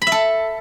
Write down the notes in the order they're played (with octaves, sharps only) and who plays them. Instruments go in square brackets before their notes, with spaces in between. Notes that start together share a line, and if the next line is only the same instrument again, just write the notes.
[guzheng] B5
E5
A4